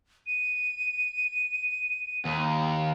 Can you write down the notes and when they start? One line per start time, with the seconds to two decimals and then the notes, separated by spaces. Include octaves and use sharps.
0.26 D#7
2.25 D#2